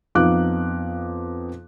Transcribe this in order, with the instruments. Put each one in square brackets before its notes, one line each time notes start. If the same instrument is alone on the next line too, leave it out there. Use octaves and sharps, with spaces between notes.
[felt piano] F2 B3 D#4 F5 D6 F#6